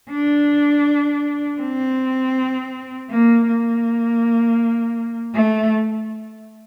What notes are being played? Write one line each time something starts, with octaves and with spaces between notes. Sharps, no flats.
D4
C4
A#3
A#3
A3